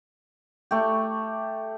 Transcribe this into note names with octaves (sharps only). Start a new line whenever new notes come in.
A3 G4